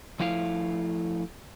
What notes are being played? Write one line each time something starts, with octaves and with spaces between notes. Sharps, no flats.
F3 A3 E4 F5